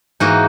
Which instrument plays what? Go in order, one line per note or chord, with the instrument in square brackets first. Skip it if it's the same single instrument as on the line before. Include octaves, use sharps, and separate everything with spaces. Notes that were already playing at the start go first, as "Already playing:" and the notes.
[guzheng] G#2 E3 A#3 D#4 F#4